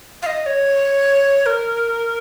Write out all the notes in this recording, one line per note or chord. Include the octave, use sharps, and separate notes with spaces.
F5
D#5
D#5
C#5
A#4